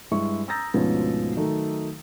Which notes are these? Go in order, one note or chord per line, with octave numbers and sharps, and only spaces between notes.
G2 G#3 E4 C#6
A#5 D#6 E6 G6 A6 A#6
D2 G#2 B2 F3 B3 C#4
D#3 F#3 A3 D#4